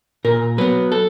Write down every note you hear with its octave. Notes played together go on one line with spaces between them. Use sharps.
A#2 A#4
F#3 B3 B4
A4